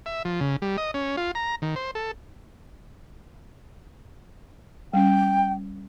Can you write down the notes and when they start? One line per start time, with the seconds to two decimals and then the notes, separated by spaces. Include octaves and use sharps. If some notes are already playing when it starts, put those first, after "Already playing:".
0.06 E5
0.25 F3
0.41 C#3
0.62 G3
0.78 D#5
0.94 C#4
1.17 F4
1.35 A#5
1.62 D#3
1.76 C5
1.95 A4
4.93 G3 C#4 G5